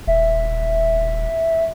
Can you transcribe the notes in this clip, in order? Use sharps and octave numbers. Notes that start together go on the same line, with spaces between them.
D#1 E5